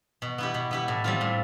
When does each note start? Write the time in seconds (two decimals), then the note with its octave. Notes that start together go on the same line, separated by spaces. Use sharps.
0.22 B2
0.38 B3 E4 G4
0.54 B2
0.71 B3 E4 G4
0.88 A2
1.04 G3 C4 F4
1.21 A2